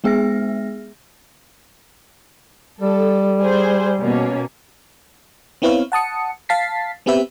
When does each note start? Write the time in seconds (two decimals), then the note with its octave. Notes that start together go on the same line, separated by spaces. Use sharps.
0.04 G#3 B3 G#4 E5 F6 A#6
2.80 G3 A4
3.41 G#4 C5
4.00 B2 A#3 C#4
5.62 B3 C4 E4 B4 C#5 F5
5.92 F#5 A5 D#6 C#7
6.49 F5 A5 A6 B6 C7
7.06 B3 C4 G4 B4 E5